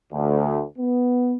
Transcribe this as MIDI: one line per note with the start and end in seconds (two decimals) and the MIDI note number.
0.13 0.62 38
0.79 1.36 59